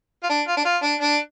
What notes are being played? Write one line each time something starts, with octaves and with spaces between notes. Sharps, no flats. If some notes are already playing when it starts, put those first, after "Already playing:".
F4
D4
F4
D4
F4
D4
D4